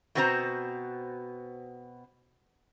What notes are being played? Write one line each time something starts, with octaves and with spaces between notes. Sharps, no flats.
B2 B3 C4 F#4 C5 A#5